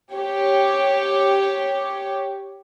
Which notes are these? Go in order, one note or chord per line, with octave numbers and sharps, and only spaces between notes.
G4 C#5